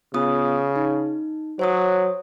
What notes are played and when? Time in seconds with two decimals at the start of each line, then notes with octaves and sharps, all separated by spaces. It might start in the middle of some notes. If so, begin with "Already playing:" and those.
0.14 C#3 B3 F4 D#6
0.76 D#4
1.59 F#3 C5 C#5 D#6